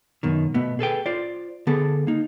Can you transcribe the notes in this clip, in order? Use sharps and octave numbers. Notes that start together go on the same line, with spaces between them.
F#2 B2 D#3
B2 A3 B3
G#4 A4 B4 G5
F4 C5 D5
D3 B3 G#4 A4
A#3 D#4